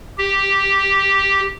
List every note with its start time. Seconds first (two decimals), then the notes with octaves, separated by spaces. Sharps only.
0.18 G4